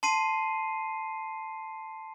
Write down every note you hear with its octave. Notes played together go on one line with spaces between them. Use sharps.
A5 C6 C7 D#7